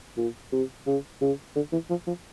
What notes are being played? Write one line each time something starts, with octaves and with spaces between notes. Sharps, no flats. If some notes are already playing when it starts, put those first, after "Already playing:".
A#2
C3
C#3
C#3
D3
E3
F3
F3